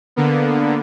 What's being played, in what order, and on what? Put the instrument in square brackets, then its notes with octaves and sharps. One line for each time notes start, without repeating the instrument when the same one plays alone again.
[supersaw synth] D3 A#3 B3